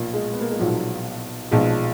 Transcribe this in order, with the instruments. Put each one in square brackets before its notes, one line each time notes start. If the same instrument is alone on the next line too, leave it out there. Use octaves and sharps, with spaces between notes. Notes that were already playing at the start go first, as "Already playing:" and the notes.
Already playing: [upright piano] B1 A#2 F3 A#3
G#3
B3
A#3
G#3
B1 A#2 F3 F#3
B1 A#2 F3 G#3